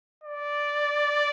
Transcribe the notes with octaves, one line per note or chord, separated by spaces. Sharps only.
D5